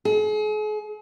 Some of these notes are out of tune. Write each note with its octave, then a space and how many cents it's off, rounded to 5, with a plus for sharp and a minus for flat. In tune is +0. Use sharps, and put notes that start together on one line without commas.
G#4 +40